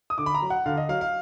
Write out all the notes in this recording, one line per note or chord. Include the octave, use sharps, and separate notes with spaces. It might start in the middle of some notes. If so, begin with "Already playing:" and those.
D#6
D3 D6
B5
A#5
F#3
F#5
D3 F5
D#5
F#3 F5
F5